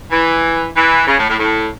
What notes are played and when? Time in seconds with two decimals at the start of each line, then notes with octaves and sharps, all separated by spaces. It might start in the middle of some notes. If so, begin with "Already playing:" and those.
0.11 E3
0.75 E3
1.07 C#3
1.18 A2
1.28 A2
1.39 A2